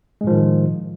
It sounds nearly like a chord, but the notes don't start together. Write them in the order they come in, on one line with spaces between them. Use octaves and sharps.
G#3 A2 F3 D#3